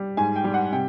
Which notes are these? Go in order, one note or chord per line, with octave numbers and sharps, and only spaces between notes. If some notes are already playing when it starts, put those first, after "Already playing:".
Already playing: G3
G#2 G#5
G5
G3
F#5
C3 G5